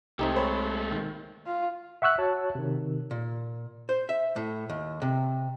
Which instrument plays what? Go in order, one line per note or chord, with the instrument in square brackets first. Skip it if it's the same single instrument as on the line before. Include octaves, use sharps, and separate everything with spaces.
[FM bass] C2 [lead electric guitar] G#3 A3 [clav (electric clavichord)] C4 D#4 G4
[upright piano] C5 C#5 B5
D#3
[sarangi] F4
[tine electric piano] E5 F#5 C#6 E6 F#6
F#4 C#5 A5
C3 D#3
[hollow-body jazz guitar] A#2
C5
E5
A2
D#2
C3